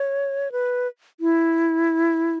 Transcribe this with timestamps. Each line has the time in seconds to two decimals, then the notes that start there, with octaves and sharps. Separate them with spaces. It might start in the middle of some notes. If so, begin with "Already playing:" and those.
Already playing: C#5
0.52 B4
1.20 E4